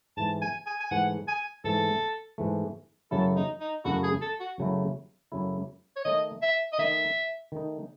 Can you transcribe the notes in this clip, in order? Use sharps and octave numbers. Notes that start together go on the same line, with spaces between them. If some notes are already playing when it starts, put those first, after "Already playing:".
G#2 E3 A3 A5
G#5
G#5
G#5
G#2 E3 A3 F#5
G#5
G#2 E3 A3 A4
G#2 E3 A3
F#2 C#3 F#3 A3 E4 A4
D#4
D#4
F#2 C#3 F#3 A3 E4 F#4
G#4
A4
F#4
F#2 C#3 F#3 A3 E4
F#2 C#3 F#3 A3 E4
C#5
D#3 A3 D#4 D#5
E5
D#5
D#3 A3 D#4 E5
D#3 A3 D#4